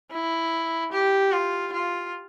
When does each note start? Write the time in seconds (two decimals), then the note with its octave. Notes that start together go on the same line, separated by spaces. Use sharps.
0.11 E4
0.92 G4
1.31 F4
1.73 F4